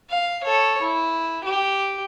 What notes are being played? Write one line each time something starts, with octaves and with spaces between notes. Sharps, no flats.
F5
A4 C#5
E4
G4